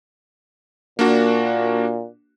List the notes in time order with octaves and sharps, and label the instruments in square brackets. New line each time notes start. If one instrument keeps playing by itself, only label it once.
[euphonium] A#2 [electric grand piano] A#3 D4 F#4